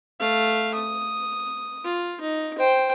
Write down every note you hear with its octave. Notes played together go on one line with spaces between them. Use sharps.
A3 F5
D#6
F4
D#4
C5 G5